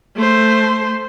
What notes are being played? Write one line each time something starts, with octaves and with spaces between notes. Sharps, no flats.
A3 C5